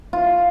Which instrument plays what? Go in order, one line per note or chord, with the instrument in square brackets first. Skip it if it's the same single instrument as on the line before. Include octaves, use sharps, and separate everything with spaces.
[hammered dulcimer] F4